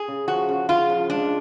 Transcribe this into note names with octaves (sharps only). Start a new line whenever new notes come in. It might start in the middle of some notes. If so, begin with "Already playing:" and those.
Already playing: G#4
C#3
F3 F#4
C#3
C#3 F4
F3
G#3 D4